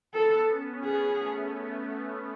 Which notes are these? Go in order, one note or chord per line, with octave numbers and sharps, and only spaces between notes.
B3 A4
C#4
B3 G#4
A3